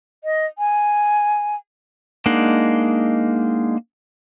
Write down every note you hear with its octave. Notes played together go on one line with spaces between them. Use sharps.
D#5
G#5
G#3 A#3 D4 D#4 F#5